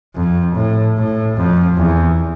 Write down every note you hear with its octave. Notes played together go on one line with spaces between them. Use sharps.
F2
A2
A2
F2
E2